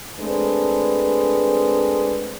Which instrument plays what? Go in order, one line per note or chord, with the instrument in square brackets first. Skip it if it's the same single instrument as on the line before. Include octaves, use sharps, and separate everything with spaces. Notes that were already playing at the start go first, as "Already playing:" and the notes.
[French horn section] G#3 A3 C4 D4 B4